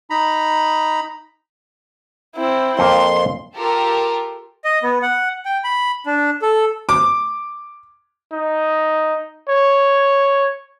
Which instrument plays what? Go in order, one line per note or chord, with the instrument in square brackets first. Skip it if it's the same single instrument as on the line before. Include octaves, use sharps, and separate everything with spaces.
[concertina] D#4 A#5 B5
[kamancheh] C4 E4
[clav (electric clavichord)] F2 A#3 F5 [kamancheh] C6
[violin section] F4 G4 A4 A#4
[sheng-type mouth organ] D#5
B3
F#5
G5
B5
D4
A4
[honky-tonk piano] D6
[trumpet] D#4
C#5